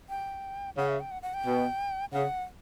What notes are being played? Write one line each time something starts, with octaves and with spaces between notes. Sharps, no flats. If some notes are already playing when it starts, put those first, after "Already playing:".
G5
C#3 F#5
E5
G5
F#5
F#5
G5
B2
C#3 F#5